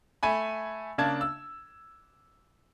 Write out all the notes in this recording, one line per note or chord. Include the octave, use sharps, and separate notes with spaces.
A3 G#5 B5
C#3 A#3 D4 A5 G#6
E6